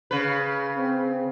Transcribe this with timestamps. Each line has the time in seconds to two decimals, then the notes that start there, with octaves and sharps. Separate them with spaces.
0.11 C#3 B4
0.77 C4